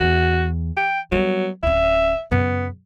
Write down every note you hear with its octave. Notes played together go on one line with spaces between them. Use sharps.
E2 F#4
G5
F#3 G3 B3
D1 C#4 E5
F#2 C#3 B3